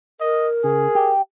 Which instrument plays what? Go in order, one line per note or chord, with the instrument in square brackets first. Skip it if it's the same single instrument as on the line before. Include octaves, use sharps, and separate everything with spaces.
[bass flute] A#4 [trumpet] D#5
[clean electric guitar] C#3 [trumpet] G#4
[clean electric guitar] G4